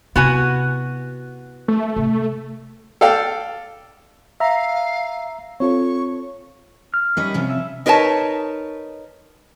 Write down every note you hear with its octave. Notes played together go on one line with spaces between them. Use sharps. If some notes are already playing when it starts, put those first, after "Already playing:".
C3 B3 E4 F#4 G#5
A3
C3
A4 D5 F5 G5
E5 F5 A#5
C4 F4 A4 C#5 C#6
F6
D#3 G3 C#4 D#5 B5
C3 F3 C#4
E5
D#4 A#4 B4 C#5 A5